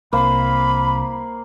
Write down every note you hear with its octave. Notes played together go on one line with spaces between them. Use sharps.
C2 A#3 C5 B5